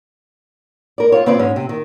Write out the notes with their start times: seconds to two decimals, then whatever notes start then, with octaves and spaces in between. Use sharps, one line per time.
0.98 A#4 D5
1.12 C4 F4 C#5
1.26 C#3 C4 F4 B4 C5 D5
1.39 G#2 C#4
1.56 C3
1.69 D#3